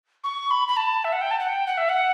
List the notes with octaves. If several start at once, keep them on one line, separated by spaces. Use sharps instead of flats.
C#6
B5
B5
A5
E5
F#5
G5
A5
F#5
G5
F#5
E5
F#5